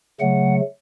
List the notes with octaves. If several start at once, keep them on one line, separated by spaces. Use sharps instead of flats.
C#3 F#3 A3 F#5